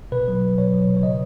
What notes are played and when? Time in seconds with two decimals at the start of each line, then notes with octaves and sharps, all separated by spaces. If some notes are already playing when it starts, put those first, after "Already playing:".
0.12 B2 B4
0.28 F#3
0.42 F#3
0.58 B2 C#5
0.74 F#3
0.88 B2
0.97 C#5
1.03 C#3 D#5